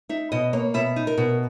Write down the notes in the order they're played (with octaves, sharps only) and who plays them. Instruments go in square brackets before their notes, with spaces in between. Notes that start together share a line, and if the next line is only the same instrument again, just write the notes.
[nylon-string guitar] D#4 E5
B2 D#5
A#3 C#5
B2 E5
D#4
A#4
B2